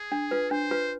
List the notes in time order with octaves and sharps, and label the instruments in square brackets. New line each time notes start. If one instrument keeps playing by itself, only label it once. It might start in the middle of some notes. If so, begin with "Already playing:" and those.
Already playing: [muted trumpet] G#4
[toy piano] D4
F4 B4
[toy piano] D4 [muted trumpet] C5
[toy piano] F4 B4